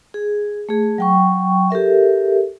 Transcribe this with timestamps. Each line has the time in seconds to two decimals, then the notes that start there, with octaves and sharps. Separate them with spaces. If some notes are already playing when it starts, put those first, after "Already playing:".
0.14 G#4
0.69 A3 G#4
0.98 F#3 G5 C#6
1.70 G4 A4 A#4 E5